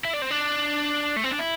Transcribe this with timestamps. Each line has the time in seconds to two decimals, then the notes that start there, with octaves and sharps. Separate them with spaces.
0.05 E4
0.13 D4
0.22 C4
0.31 D4
1.16 A3
1.24 C4
1.31 D4
1.39 E4